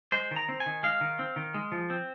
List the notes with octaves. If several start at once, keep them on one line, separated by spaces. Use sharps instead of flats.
G#3 C5
D#3
A#5
C4
G#5
D#3
G#3 F5
D#3
C4
D#3
G#3
F3
C4